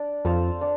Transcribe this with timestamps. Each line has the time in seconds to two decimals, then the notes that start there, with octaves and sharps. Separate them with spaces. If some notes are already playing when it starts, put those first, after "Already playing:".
Already playing: D4
0.25 F2 A4 C5 F5
0.61 D4